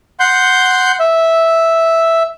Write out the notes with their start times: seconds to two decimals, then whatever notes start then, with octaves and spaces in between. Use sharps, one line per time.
0.20 F#5 C6 G6
1.00 E5